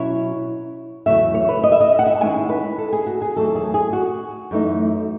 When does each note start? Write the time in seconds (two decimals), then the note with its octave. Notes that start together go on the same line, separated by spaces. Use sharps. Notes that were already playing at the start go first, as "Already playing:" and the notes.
Already playing: B2 F#3 C#4 E4 C#5
1.06 E2 C#3 F#3 A3 E5
1.34 C#5
1.49 B4
1.64 D#5
1.72 E5
1.81 D#5
1.92 E5
1.99 F#5
2.06 E5
2.16 A5
2.21 D#3 G#3 C#4 E4 G#5
2.49 B4
2.78 A4
2.93 G#4
3.07 F#4
3.22 G#4
3.36 E2 D#3 F#3 A3 A4
3.55 G#4
3.74 G#4
3.93 F#4
4.51 F#2 E3 A3 D#4